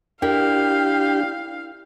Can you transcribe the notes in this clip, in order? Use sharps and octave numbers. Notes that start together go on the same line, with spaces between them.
D4 E4 G4 A#4 F5 G5